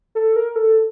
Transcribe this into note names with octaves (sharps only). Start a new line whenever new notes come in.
A4
A#4
A4